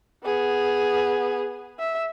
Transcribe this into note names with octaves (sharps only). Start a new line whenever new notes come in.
B3 G#4
E5